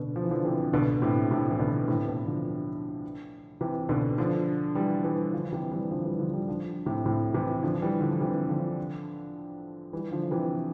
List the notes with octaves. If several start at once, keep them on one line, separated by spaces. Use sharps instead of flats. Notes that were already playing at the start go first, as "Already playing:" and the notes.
Already playing: B2 D3
F3
E3
D3 F3
C3 E3
B2 D3
A2 C3
A2 C3
E3
B2 D3
A2 C3
B2
D3 F3
C3 E3
B2 D3
D3 F3
E3 G3
E3 G3
D3 F3
C3 E3
E3 G3
D3 F3
E3 G3
D3 F3
E3 G3
D3 F3
A2 C3
A2 C3
C3 E3
D3 F3
E3 G3
D3 F3
C3 E3
D3 F3
E3 G3
D3 F3
C3 E3